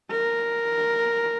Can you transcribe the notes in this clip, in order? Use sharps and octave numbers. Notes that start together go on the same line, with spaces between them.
A#4